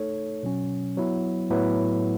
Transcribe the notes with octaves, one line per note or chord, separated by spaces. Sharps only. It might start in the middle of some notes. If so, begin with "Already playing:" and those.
Already playing: A3 D#4 A4 C#5
B2 F#3 C#4
F#3 B3 E4
A2 F#3 B3 E4 B4